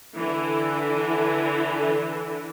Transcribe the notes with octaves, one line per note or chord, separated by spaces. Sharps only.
D3 E3